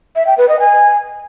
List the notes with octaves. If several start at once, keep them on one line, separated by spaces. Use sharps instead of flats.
E5
G5
B4
D#5
G#5